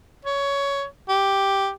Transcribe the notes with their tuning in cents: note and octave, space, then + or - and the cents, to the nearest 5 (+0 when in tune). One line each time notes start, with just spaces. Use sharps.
C#5 +15
G4 +0